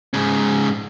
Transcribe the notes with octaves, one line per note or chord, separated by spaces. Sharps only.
G#2 C#3